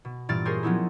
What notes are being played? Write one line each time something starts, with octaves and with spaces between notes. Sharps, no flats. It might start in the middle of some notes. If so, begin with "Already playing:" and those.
B2
G2 A#2 E3 D5 F6 A6
G4 G#4 A#4 C5 C#5
F3 F#3 B3 C#4 D#4 E4